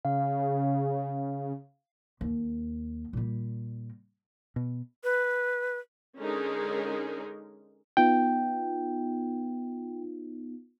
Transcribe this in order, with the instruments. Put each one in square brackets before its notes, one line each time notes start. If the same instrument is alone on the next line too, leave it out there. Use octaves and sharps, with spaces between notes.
[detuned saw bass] C#3 [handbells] F5
[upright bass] D#2
A#2 G3
[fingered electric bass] B2
[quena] B4
[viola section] D3 G#3 C#4 D#4 G#4 A#4
[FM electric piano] B3 D#4 F4 [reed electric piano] G5